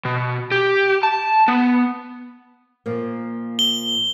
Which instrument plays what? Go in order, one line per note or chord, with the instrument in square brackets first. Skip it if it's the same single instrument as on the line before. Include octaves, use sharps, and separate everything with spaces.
[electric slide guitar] B2
G4
A5
B3
[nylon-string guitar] A#2 F3 A#3
[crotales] G7